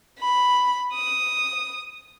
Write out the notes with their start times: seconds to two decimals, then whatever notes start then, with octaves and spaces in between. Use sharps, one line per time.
0.19 B5
0.93 D#6